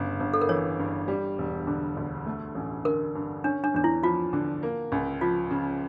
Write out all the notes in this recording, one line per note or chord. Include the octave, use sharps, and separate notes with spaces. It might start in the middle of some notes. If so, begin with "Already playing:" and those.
Already playing: G1 C#3
G1
A4
A#4
E3 C#5
G2
G3
E1
D3
D2
A3
A1
D3 A#4
G2
C#4 D4
D4
E2 D4
E4
F3 F4
D3
A#3
C#2
F3 F4
C#3